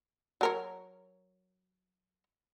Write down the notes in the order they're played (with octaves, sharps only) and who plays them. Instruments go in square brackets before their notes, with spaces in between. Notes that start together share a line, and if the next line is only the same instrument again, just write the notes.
[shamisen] F#3 A#4 C#5